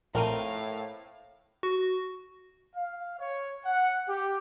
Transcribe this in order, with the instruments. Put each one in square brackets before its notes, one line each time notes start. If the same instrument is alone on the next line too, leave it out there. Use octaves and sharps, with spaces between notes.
[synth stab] A#1 A#4 D#7 [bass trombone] A2 [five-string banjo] A3 A#3 C4 [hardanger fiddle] F5
[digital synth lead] F#4
[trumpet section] F5
C#5
F#5
G4